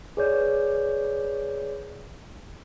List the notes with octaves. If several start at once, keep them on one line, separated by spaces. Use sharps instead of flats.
G#4 B4 C#5 D5 G6